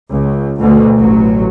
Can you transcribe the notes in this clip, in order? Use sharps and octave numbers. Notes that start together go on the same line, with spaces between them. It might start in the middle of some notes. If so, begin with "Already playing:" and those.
C#2
D2 B2
A1 F#3